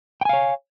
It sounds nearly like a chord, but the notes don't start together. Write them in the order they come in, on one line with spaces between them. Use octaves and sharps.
G5 G#5 F5 C#5